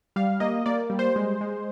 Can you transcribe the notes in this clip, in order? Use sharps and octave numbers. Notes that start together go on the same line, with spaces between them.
G3 F5
A#3 D#5
A#3 D5
G3
C5
G#3
G#3